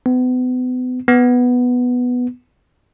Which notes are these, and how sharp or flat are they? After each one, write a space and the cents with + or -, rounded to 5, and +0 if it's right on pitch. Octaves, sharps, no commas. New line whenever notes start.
B3 +35
B3 +0